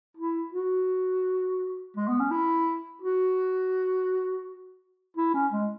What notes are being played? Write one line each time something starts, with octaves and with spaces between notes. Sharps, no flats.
E4
F#4
G#3
B3
C#4
E4
F#4
E4
C#4
G#3